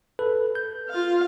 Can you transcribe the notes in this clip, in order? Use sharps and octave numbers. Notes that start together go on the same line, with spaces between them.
A4 B4
G6
F4 F5